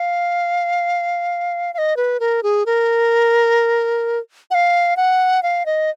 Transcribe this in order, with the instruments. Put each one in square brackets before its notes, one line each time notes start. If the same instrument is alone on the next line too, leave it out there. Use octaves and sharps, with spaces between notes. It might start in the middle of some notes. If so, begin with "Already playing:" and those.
Already playing: [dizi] F5
F5
D#5
B4
A#4
G#4
A#4
F#5
F5
F#5
F5
D#5